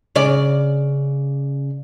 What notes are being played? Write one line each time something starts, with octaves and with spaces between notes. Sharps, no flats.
C#3 D5